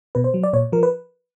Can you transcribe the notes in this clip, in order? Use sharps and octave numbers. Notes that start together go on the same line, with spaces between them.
B2 B4
C5
F#3
D5
A#2 C#5
F3 A#4
B4